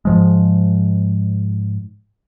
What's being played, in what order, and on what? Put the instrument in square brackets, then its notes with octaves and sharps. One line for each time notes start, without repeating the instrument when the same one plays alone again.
[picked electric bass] G#2 F3 G#3